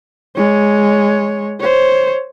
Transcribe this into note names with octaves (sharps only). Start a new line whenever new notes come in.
G#3 C#5
C5 C#5